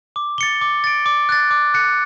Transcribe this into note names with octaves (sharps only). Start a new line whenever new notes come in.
D6
A6 C#7 G7
D6
A6 D7
D6
F#6 A6
D6
F#6 C#7